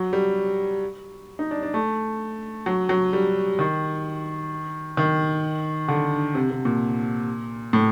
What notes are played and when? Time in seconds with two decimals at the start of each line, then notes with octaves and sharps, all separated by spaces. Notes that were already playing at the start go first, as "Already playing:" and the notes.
Already playing: F#3
0.13 G3
1.39 D#4
1.51 D4
1.63 D4
1.74 A3
2.66 F#3
2.89 F#3
3.13 G3
3.59 D#3
4.97 D#3
5.88 D3
6.35 C3
6.50 C3
6.65 A#2
7.73 A2